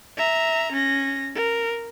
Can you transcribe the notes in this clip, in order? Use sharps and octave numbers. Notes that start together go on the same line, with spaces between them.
E5 A#5
C#4 A#6
A#4